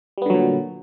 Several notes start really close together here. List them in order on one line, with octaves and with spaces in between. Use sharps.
G3 B3 D3 F#3 A#2